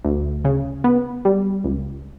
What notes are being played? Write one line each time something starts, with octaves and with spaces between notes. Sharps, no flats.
D2
C#3
B3
G3
C#2